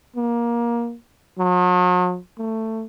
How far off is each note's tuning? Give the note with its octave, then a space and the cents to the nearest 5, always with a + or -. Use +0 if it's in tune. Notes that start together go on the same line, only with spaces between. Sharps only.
A#3 +20
F#3 -45
A3 +15